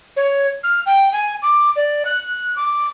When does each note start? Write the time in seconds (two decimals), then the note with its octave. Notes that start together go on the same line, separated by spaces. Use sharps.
0.17 C#5
0.64 F6
0.86 G5
1.13 G#5
1.42 D6
1.76 D5
2.05 F#6
2.56 D6